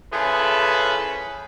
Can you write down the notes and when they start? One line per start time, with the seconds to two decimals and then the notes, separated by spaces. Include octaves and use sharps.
0.13 F3 C#4 E4 G#4 A4 B4